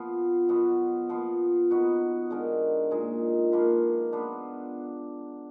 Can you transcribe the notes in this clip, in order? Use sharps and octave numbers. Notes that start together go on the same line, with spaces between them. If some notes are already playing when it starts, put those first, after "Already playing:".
Already playing: F3 B3 F4
B2 F#3 B3 F4
F3 B3 F4
B3 D#4 F#4 B4
D3 G#3 D#4 A#4
A#2 G#3 D#4
F3 A#3 F4 B4
B3 D4 F4 B4